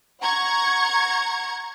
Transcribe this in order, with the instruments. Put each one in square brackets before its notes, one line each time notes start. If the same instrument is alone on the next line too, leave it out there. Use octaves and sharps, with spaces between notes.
[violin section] F#5 A#5 C#6 G#6